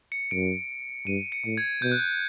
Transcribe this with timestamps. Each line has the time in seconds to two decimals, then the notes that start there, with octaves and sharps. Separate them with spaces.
0.12 C#7
0.31 F#2 D7
1.06 G2 D#7
1.32 C#7
1.45 A2
1.57 G#6
1.82 B2 G6
1.92 F#6
2.00 G6